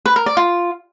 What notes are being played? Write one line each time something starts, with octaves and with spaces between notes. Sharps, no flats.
B4
A#4
D5
F4